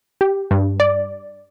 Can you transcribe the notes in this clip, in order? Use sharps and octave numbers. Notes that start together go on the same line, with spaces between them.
G4
G2
D5